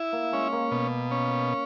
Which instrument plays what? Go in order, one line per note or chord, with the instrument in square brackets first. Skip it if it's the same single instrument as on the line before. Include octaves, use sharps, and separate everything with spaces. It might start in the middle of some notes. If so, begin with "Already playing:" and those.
Already playing: [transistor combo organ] E4
[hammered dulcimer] A#3
[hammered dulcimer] G#3 [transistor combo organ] C#4
[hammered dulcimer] A#3
[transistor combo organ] B2
C#4